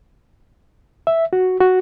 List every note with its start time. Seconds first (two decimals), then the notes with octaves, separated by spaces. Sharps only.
1.07 E5
1.33 F#4
1.60 F#4